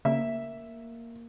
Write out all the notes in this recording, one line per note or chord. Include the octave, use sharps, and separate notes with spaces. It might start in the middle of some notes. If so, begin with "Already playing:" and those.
C#3 A#3 E5